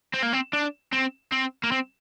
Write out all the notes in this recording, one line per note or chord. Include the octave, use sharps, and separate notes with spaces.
C4
A#3
C4
D4
C4
C4
A#3
C4